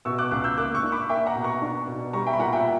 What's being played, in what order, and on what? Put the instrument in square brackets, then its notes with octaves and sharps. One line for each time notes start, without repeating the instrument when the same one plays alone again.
[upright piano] B2 C#6 E6
D6 F#6
C#2 D6 F#6
E6 G6
A#3 D6 F#6
C#6 E6
D4
B5 D6
A#3 E5 G5
F#5 A#5
B2
A#5 C#6
D4
B2
G3 A#5 C#6
E5 G5
B5
A#2 F#5 A#5
E5 G5